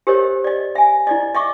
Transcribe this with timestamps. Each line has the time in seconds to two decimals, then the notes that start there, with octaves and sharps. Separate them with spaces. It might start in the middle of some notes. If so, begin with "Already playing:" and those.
0.07 G4 A#4 C5 C#5 D#5
0.44 D5 D#5
0.75 E5 G#5
1.07 E4 D5 D#5
1.35 D#5 E5 C#6 D6